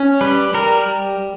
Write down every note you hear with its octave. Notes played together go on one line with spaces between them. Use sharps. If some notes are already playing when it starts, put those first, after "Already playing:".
Already playing: C#4
G3 B4
G3 A#4